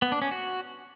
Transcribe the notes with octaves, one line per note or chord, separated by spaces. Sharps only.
B3
D4
C#4
F#4